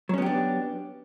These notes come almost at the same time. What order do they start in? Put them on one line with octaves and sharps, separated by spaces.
F#3 C#4 B3 G4 D4